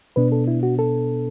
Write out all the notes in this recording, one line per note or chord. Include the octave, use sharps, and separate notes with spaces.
B2 B3 D4 B4
A4
E4
F#4
A4